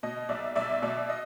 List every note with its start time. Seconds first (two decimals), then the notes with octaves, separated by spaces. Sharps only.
0.03 B2 D#5
0.29 B1 D5 E5
0.56 B1 D5 E5
0.82 B2 D5 E5
1.10 D#5